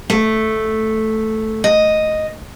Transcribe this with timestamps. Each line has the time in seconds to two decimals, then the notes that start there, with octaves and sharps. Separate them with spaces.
0.10 A3
1.64 D#5